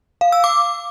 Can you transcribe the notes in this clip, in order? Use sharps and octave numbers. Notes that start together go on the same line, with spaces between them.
F5
E6
D6